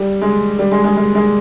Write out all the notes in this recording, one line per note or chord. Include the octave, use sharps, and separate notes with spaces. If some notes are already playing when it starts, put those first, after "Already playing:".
Already playing: G3
G#3
G3
G#3
G#3
G#3
G#3